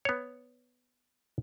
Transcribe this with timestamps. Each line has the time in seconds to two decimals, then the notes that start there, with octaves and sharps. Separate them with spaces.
0.05 B3 C#5